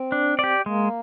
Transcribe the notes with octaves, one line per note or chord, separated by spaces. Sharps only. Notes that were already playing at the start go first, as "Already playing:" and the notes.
Already playing: C4
D4
G4 D5
G#3 A#3